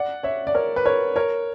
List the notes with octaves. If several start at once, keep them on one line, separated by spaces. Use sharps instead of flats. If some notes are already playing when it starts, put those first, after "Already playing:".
Already playing: D5 F#5
C#5 E5
D5
A#4 C#5
B4
A#4 C#5
A#4 C#5